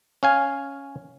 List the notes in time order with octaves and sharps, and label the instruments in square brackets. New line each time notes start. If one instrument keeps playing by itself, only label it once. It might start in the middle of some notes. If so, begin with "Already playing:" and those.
[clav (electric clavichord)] C#4 F5 G#5